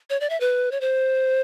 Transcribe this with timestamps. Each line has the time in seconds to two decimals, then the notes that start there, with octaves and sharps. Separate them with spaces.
0.10 C#5
0.20 D5
0.30 E5
0.40 B4
0.71 C#5
0.81 C5